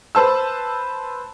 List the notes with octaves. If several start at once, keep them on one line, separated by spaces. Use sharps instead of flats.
B4 C5 A5 E6